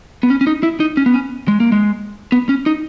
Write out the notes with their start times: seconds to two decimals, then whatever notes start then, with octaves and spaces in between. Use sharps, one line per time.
0.23 B3
0.30 C#4
0.41 C#4
0.47 D#4
0.63 E4
0.80 D#4
0.97 C#4
1.06 B3
1.14 C#4
1.48 G#3
1.60 A#3
1.72 G#3
2.32 B3
2.49 C#4
2.66 D#4